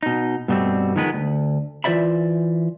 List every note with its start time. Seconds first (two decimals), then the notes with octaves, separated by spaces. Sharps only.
0.03 B2 D#4
0.48 G2 B2 G3 A3 C4
0.96 D#3 F3 G#3 B3 A#4 B4
1.14 D2
1.84 E3 F4 C5 D5 E5 B5